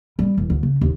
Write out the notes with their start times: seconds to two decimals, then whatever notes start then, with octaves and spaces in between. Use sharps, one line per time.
0.19 G3 C4
0.37 E1 E2
0.50 D2
0.63 C#3
0.81 E1 D#2